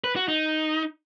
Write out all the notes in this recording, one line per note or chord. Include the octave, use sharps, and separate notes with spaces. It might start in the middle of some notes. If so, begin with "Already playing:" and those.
B4
F#4
D#4